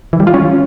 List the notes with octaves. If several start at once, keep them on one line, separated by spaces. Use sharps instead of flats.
E3
G3
F4
C#4